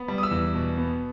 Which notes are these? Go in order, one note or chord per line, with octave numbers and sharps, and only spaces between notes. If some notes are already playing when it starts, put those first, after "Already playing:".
Already playing: B3
G3
D#6
E6
E2
B2
B3